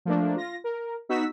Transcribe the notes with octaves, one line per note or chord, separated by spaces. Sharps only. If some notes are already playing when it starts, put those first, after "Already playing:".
F3 A3 A#3 D4
F4 A#6
A#4
B3 D#4 F#4 E6 B6